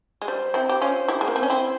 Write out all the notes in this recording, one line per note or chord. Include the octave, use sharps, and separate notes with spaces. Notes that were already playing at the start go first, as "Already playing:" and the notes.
G#3
G3 C5
C4 E4
G4
C#4 F4
E4 G4
G#3
A#3
C4
C#4
C4 E4